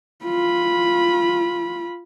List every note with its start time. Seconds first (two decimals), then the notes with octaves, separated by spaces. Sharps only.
0.25 F4 B5